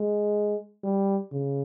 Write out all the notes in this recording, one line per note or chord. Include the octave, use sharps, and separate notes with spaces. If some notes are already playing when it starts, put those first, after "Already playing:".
Already playing: G#3
G3
C#3